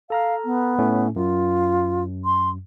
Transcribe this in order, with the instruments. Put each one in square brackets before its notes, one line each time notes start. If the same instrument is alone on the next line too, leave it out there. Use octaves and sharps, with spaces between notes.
[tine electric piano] A4 A#5 F6 [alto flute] F5
[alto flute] B3
[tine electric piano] A2 A3 C#4
[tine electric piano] F#2 [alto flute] F4
[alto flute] C6